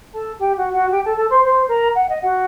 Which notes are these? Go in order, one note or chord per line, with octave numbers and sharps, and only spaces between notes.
A4 A5
G4 G5
F#4 F#5
F#4 F#5
G4 G5
A4 A5
A4 A5
C5 C6
C5 C6
A#4 A#5
F#5
D#5
F#4 F#5